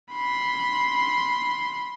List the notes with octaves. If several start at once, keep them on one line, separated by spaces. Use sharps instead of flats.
B5 C6